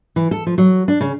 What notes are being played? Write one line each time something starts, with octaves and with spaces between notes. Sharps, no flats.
E3
A4
F3
F#3
D4
C#3